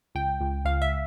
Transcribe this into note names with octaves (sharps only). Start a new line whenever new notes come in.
C#2 G5
C#2
C#2 F5
E5